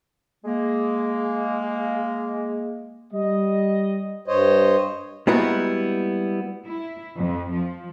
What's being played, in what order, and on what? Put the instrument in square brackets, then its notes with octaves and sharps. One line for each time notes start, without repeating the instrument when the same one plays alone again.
[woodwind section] G#3 A#3
[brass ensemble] G3 D#5
[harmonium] G2 C5 C#5 D#5
[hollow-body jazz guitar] G3 G#3 A#3 B3 E4 F#4
[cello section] E4
F2
F3